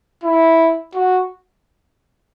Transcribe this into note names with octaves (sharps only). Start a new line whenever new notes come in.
E4
F#4